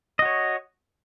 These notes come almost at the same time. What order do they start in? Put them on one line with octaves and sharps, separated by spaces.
D#5 F#4 C#5